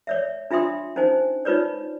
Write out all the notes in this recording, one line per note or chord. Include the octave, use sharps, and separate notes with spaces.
C#5 D5 E5
D4 F4 E5 G5 C6 D#6
C#4 D#4 C5 G#5
D#4 F4 B4 C#5 D5